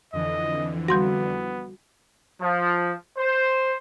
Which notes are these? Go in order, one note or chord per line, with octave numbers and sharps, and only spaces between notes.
F2 D3 E3 D#5
G3 B3 F#4 C6 A#6
F3
C5